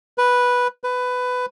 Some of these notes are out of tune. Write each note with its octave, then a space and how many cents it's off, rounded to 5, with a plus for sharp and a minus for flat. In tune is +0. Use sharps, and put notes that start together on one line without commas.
B4 -5
B4 +15